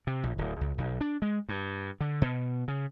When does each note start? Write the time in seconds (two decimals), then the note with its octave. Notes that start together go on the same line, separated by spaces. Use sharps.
0.07 C3
0.23 A#1
0.38 D1
0.61 C#2
0.78 B1
1.01 D4
1.22 G#3
1.49 G2
2.00 D3
2.22 B2
2.68 C#3